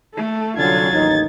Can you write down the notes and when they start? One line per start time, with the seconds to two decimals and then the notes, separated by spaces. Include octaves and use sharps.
0.14 A3 A4
0.57 C2 D3 F#3 C#4 F4 G#6 A6
0.92 A1 D#2 D#4